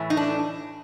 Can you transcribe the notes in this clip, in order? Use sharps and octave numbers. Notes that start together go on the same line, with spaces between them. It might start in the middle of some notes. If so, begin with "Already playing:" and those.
Already playing: A2 E3 A3
D#4
D4